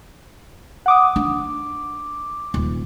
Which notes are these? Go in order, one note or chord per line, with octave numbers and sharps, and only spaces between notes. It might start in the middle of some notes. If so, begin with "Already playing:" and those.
F#5 D6 D#6
D4 D6
D#1